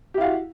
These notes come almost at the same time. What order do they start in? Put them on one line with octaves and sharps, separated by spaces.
G4 E4 F5 F#4